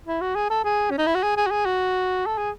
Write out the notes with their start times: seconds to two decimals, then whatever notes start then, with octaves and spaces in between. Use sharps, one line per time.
0.07 E4
0.21 F#4
0.36 G#4
0.50 A4
0.64 G#4
0.91 C#4
0.98 D#4
1.07 E4
1.15 F#4
1.23 G#4
1.37 G#4
1.46 F#4
1.51 G#4
1.66 F#4
2.26 A4
2.38 G#4